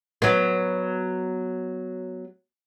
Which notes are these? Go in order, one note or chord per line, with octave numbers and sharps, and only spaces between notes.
F#3 B3